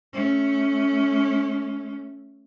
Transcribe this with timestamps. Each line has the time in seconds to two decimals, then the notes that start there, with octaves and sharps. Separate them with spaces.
0.13 A3 C#4